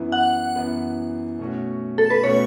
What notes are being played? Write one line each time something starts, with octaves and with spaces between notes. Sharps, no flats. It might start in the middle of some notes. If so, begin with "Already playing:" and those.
Already playing: F#2 E3 B3 E4
F#5
F#2 E3 B3 E4
B2 A3 C#4 F#4
A4
B4
B2 A3 C#4 F#4 C#5